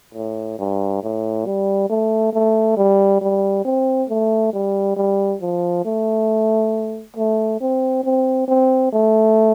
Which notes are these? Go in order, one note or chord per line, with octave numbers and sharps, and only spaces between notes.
A2
G2
A2
G3
A3
A3
G3
G3
C4
A3
G3
G3
F3
A3
A3
C4
C4
C4
A3